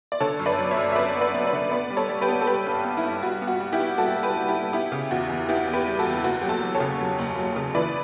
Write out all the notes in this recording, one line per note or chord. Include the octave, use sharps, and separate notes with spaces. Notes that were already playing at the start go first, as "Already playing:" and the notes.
D5
D3 A4 C#5
F#2
B4 D5
F#3
C#5 E5
F#2
E5
F#2 B4 D5
B3
B4 D5
B3
B4 D5
D3
B3 B4 D5
G3
A4 C#5
G3
G4 B4
B3
A4
G3 G4 B4
G2
B3
E4
G2
G3 F#4
B3
F#4
G3
E4 G4
B3
G3 F#4 A4
G3
G4 B4
G3
E4 G4
G3
B3 E4 G4
C#3
E2 F#4
E2
B3 E4 G4
E2
G4 B4
G3
F#4 A4
E2
F#1 F#4
F#3 G4
F#4 A4
F#3
A4 C#5
C#3
F#3
F#1
F#3
C#3
E3 B4 D5